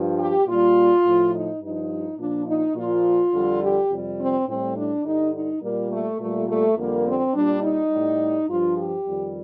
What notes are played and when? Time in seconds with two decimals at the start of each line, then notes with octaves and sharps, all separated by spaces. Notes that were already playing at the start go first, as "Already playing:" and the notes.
Already playing: G2 F3
0.18 G4
0.46 A#2 G3 F4
1.04 A2 F3
1.33 D#4
1.61 G2 F3 D#4
2.18 A#2 F3 D4
2.47 D#4
2.76 A#2 F3 F4
3.33 F2 D3 G3
3.62 G4
3.91 F2 C3 G3
4.19 C4
4.47 A2 G3 C4
4.77 D4
5.05 G2 D3 G3 D#4
5.34 D#4
5.62 A#2 G3 A#3
5.91 A3
6.19 A#2 G3 A3
6.48 A3
6.76 F2 D3 G3 A#3
7.05 C4
7.34 A#2 G3 D4
7.63 D#4
7.91 A2 G3
8.49 G2 F3 F4
8.77 G4
9.06 F2 D#3 G3